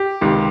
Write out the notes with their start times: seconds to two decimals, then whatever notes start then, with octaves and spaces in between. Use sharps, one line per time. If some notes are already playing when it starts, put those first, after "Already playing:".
Already playing: G4
0.21 C#2 C3 D#3